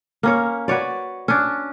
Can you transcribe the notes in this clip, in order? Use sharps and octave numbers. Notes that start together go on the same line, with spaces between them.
A#3 C#4 C#5
F#4 B4 C#5 D5
C#4 D4